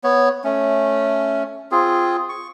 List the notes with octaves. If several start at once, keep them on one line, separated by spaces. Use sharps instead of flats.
B3 C#5
A3 C#4
C4 F4 G#4
C#6